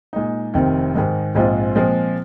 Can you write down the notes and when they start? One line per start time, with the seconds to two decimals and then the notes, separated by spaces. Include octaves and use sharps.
0.13 A#2 G#3 D#4
0.54 F1 F2 D#3 C4
0.95 G#2 D#3 G#3
1.35 A#1 G#2 G#3 C4 F4
1.75 A#2 F3 G#3 C4